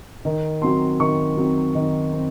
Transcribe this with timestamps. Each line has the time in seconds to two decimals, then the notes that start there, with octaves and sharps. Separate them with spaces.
0.25 D#3
0.62 F#3 C4 C6
1.00 D#3 C#6
1.37 F#3 C4
1.75 D#3
2.13 C4